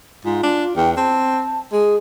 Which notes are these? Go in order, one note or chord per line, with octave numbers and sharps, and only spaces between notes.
G#2 F4
D4
E2 G5
C4 A5
G#3 G#4